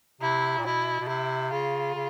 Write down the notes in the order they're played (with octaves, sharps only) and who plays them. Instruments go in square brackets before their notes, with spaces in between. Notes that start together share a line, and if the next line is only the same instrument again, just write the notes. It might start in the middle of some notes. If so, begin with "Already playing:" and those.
[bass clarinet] C3 [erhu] E4
[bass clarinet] A#2
[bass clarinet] B2 [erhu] E4
[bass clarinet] B2
[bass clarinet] C3 [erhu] E4
[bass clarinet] C#3 [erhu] F4
[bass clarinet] C#3